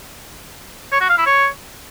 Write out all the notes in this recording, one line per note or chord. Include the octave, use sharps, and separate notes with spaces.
C#5
F#4
F5
E4
C#5